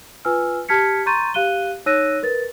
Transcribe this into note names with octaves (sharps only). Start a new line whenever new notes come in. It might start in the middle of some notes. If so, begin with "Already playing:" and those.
F4 B4 G#5 E6 F6
G4 A5 F6 G#6 B6 C#7
A#5 C6 C#6 G6 A6 D#7
G4 F5 F#6 D#7 G7
D#4 C#5 E6 F#6 A#6 D#7
A#4 B4 A6